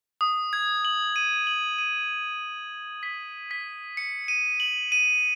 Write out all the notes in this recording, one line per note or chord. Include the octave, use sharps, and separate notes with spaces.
D#6
G#6
F#7
D#7
F#7
D#7
B6
B6
C#7
D#7
F#7
D#7